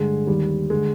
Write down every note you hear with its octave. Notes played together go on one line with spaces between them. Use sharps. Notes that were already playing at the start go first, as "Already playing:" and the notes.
Already playing: G2 D3 G#3
D#2 D#3 G3
D3 G#3